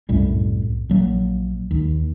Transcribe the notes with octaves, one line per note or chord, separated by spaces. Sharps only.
C2 F#2 A2 G3
A#1 F#3 A#3
D#2